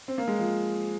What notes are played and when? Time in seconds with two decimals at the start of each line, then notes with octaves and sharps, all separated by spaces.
0.08 C4
0.18 A#3
0.28 G#3
0.38 F3